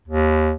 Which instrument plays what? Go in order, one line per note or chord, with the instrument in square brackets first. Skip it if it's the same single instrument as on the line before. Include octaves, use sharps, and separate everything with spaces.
[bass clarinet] D#2